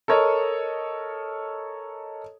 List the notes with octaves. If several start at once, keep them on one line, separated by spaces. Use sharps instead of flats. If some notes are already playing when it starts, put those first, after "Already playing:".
A4 A#4 C#5 D#5